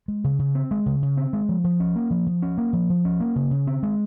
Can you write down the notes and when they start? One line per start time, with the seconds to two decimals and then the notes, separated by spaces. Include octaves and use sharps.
0.08 G#3
0.24 C#3
0.39 C#3
0.55 C4
0.71 G#3
0.86 C#3
1.02 C#3
1.17 C4
1.33 G#3
1.49 F3
1.64 F3
1.80 C#4
1.96 A#3
2.10 F3
2.27 F3
2.42 C#4
2.58 A#3
2.73 F3
2.90 F3
3.05 C#4
3.20 A#3
3.36 C#3
3.51 C#3
3.67 C4
3.83 G#3